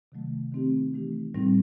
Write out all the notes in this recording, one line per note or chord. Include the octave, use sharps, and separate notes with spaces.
C3 D#3 F#3 A3
D#3 A3 C4 D#4 G4
E3 A3 D#4 G4
A2 G3 C4 D#4